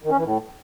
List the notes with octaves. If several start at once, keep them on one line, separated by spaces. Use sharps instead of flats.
D#3
C#4
E3
A2